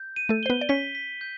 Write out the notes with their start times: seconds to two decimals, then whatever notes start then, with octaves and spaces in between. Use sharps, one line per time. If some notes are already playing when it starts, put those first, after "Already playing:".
Already playing: G6
0.16 D#7
0.29 A3 A4
0.43 C5 G7
0.50 B3 B4
0.61 D5
0.69 C#4 C#5 B6
0.95 B6
1.21 G6